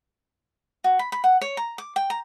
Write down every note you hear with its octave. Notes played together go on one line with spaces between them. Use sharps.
F#4
B5
B5
F#5
C#5
A#5
D6
G5
A#5